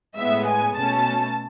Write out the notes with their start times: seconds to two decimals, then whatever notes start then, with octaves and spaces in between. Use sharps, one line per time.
0.17 A2 G#3 B3 E5
0.47 G#5
0.76 B2 A3 C#4 A5